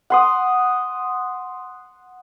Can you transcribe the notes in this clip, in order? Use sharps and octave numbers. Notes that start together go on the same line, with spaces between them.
F#5 C6 D#6